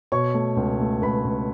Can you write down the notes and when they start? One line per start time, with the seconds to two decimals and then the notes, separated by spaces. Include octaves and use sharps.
0.12 B2 C#5 C#6
0.34 A3
0.57 C#2
0.80 A3
1.02 C#2 B4 B5
1.25 C#2